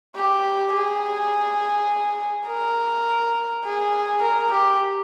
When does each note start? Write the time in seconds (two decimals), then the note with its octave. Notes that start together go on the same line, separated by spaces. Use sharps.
0.16 G4
0.73 G#4
2.47 A#4
3.64 G#4
4.22 A#4
4.51 G4